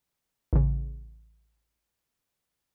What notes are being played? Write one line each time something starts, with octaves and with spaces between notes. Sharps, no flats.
A1 C#3